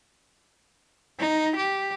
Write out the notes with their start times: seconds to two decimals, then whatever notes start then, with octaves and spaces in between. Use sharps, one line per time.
1.19 D#4
1.56 G4